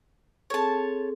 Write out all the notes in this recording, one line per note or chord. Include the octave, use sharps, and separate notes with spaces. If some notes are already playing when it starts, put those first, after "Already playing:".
C4 G#4 A4 C#5 A5